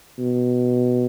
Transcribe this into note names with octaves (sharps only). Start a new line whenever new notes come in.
B2